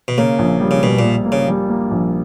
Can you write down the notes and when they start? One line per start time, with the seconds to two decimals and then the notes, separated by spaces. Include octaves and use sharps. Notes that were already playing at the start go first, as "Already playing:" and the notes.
0.08 B2
0.18 C#3 A#3
0.39 A#1
0.61 G3
0.71 C#3
0.82 B2 G3
0.99 A#2
1.05 A#3
1.26 A#3
1.32 C#3
1.48 G3
1.69 A#3
1.91 A#1